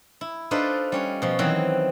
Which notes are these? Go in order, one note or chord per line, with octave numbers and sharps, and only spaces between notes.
E4
D4 D#4 F4 A4 B4 C5
G3 C#4 C#5
B2 F3
D#3 E3 F#3 C4